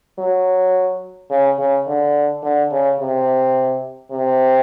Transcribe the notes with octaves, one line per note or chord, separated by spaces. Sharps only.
F#3
C#3
C#3
D3
D3
C#3
C3
C3